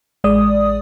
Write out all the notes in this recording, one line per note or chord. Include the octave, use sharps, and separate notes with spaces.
A1 G#3 D5 D#6